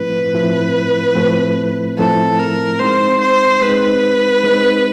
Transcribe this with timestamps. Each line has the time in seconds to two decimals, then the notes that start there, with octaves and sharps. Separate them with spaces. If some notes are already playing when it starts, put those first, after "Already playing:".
Already playing: A2 F3 A3 C4 E4 B4
0.34 A2 F3 A3 C4 E4
1.15 A2 F3 A3 C4 E4
1.98 A2 F3 A3 C4 E4 A4
2.39 A#4
2.79 G#3 C4 D#4 C5
3.21 C5
3.61 G#3 C4 D#4 B4
4.44 G#3 C4 D#4